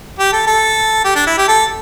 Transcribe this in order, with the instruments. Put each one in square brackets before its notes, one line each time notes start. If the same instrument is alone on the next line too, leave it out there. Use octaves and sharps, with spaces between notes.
[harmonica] G4
A4
A4
G4
D4
E4
G4
A4